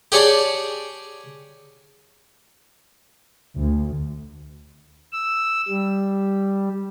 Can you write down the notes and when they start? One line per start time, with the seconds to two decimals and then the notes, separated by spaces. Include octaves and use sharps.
0.12 G4 G#4 C#5 D5 A5
3.56 D2
5.13 E6
5.68 G3